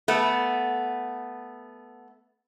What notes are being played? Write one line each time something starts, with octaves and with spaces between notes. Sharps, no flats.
A3 B3